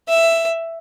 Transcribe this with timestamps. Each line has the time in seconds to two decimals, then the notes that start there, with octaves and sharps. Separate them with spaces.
0.09 E5